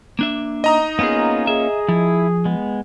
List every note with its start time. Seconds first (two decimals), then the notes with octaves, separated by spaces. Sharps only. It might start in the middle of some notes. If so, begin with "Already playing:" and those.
0.19 A#3 D4 E5
0.64 D#4 D#5 A#5 D#6
0.99 A#3 B3 C#4 F4 G#4
1.47 G#4 E5
1.89 F3 E4
2.45 G#3 B3